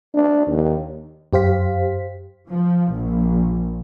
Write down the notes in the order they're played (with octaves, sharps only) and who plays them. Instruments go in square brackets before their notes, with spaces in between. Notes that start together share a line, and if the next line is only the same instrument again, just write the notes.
[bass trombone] D4
D#2
[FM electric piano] F#2 G4 C5 F5 B6
[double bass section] F3
A#1